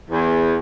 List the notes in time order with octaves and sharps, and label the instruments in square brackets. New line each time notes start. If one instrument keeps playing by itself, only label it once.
[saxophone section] E2